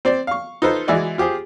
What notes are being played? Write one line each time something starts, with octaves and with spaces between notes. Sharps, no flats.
C4 C5 D5
F5 C#6
D#4 F4 A4 B4 C5
E3 G#3 E4 F#4 D5 D#5
F4 G4 G#4 C5